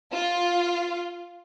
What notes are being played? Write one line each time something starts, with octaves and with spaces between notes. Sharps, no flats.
F4